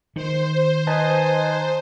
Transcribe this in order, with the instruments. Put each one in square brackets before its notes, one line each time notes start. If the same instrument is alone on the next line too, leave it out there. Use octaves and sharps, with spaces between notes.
[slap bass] D#3 [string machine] C5
[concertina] D#4 G#5 [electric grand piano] B4 D#5 A5